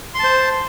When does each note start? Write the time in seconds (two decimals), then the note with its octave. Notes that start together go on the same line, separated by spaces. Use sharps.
0.14 C6
0.19 A5
0.24 C5